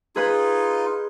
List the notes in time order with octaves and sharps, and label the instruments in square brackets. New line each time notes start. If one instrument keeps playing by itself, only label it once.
[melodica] D#4 F4 [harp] G#4 B4